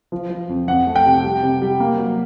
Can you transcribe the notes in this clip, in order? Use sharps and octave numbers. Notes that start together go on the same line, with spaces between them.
F3
F3
F2
F2 F#5
A3
G5
C3
G3
C3
G3
A#3
F#3